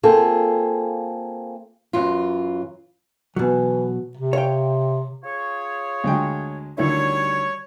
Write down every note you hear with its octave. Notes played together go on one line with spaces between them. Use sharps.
A#3 C4 F4 G#4 A4
F#2 E3 F#3 F4
B2 E3 F#3
C3
C#5 F5 G5
F4 G#4 C#5
D2 G#3 G5
D2 D#3 G3 E4 C#5